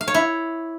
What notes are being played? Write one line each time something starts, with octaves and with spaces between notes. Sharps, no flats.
F5
C#5
E4